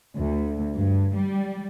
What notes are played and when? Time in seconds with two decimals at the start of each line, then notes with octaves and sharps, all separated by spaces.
0.18 D2
0.76 G2
1.14 G3